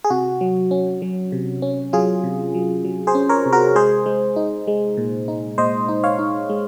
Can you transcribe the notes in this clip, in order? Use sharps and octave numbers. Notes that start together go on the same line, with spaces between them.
G#4
C3 F#4
F#3
C#4
F#3
C3
C#4
F#3 F4 G#4
C3
F#3
F#3
G#4 C5
C#4
A#4 C#5
C3
F#4 A#4
G#3 G#4 C5
G#3
D#4
G#3
A#2
D#4
A#2 C5 D#5
D#4
C#5 F5
D#4
G#3